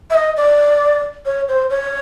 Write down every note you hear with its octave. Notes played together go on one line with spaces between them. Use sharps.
E5
D#5
D5
C#5
C5
C#5